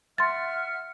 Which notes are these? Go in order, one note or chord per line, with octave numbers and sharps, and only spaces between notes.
E5 F#5 C6 F6 A6